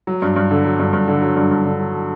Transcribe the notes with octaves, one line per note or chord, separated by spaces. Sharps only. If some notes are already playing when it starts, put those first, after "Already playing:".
F#3
G2
G2
D3
F#3
G2
G2
D3
F#3
G2
G2
D3
F#3